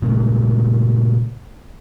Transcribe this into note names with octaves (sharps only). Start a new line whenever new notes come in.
A#2 C#3 G#3 A3